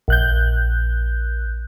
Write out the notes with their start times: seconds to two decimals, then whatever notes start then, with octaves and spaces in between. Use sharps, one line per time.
0.08 A#1 F#6 G6